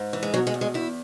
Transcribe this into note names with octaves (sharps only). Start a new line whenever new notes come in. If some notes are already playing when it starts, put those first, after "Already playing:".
Already playing: G#2
E3
G#3
B2 F#3
G#3
E2
G#3
E2 E4